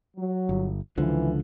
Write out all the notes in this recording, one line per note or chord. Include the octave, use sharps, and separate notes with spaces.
F#3
G1
C#2 D3 E3 F3